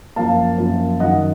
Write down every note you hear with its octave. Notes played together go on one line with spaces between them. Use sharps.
F#2 F3 A#3 F5 A5
F#2 F3 A#3
F#2 D#3 F#3 D#5 F#5